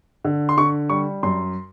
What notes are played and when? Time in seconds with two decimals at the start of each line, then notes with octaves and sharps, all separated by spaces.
0.25 D3
0.49 C6
0.57 D3 C#6
0.90 G3 C#6
1.23 F#2 C6